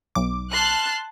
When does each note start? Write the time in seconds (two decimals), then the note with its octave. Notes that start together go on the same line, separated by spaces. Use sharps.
0.15 B1 D6
0.52 A5 C6 F6 F#6